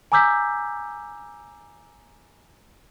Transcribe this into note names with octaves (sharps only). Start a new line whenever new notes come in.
G#5 A#5 D6 E6 G6 B6